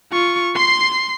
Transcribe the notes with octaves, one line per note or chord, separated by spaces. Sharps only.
F4 C#6
C6 C7